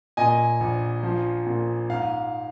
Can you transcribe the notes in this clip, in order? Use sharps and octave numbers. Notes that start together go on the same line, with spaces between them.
A#2 D#5 G#5
A#1
F3
A#2
G#2 F5